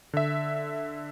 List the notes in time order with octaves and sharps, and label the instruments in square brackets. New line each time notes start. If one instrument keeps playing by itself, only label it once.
[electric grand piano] D3 E5